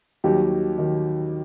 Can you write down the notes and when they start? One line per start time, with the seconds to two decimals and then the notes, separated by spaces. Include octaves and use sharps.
0.24 D#2 D#3 F#3 G3 G4
0.78 D#3 F#3